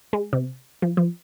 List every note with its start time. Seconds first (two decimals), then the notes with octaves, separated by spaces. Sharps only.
0.13 G#3
0.33 C3
0.82 F3
0.97 F3